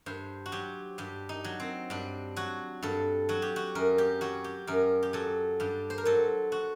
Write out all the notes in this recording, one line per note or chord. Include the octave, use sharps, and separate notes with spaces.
G2 C5
F#4
F#3 G4
G2 G4
D#4
F#3
C4
G2 D4
F#3 F#4
G2 A4
F#3 F#4
G4
F#4
F#2 A#4
G4
F#3 F#4
G4
F#2 A#4
G4
F#3 A4
G2 G4
C5
A#4
F#3 A4
F#4